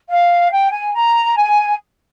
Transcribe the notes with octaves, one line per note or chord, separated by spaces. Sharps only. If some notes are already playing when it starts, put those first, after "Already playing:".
F5
G5
G#5
A#5
G#5